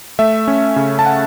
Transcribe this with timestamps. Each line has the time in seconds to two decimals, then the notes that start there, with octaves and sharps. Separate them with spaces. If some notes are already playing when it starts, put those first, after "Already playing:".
0.19 A3 E5
0.48 C#4
0.76 C#3
0.99 A5
1.06 F#5